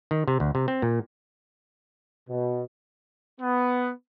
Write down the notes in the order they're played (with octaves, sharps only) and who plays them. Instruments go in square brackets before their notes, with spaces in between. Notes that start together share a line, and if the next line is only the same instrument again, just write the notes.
[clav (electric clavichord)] D#3
C3
D2
C3
C4
A#2
[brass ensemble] B2
[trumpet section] B3